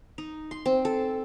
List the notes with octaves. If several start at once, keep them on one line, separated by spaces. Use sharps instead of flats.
D#4
C6
C4
A4